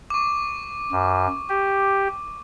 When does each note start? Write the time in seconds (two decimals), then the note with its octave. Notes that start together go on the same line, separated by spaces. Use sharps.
0.10 C#6 D6
0.92 F#2
1.49 G4